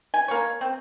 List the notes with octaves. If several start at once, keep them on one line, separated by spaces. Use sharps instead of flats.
G#5
A#3 D4 C#5
C4